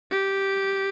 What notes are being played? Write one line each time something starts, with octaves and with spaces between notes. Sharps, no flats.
G4